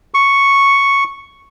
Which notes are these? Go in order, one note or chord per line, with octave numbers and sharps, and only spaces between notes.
C#6